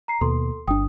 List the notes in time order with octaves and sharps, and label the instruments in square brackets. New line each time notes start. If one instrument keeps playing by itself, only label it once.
[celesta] A#5 C7
[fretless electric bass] D#2 B2 [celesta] A4 C6
[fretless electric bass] G1 D4 [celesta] G5 D#6